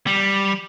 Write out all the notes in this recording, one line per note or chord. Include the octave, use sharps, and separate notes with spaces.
G3